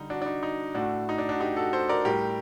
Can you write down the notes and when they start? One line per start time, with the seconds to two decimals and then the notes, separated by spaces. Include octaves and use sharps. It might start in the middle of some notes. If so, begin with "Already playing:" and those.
Already playing: D3 G3 D#4
0.10 D4 F#4
0.22 D4
0.26 D#4
0.43 D#4
0.75 A2 A3 D4 F#4
1.09 D#4
1.18 D4
1.29 D4 F#4
1.40 D#4 G4
1.56 F#4 A4
1.73 A4 C5
1.89 A#4 D5
2.05 A2 G3 G4 A#4